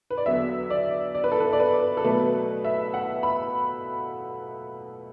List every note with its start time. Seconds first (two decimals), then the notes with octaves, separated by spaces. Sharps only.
0.10 B4
0.17 D5
0.26 E2 D3 F#3 B3 E5
0.70 D5
1.15 D5
1.24 B4
1.32 A4
1.40 B4
1.53 D5
1.60 B4
1.97 A4
2.04 B2 F#3 A3 B4
2.65 E5
2.94 F#5
3.23 B5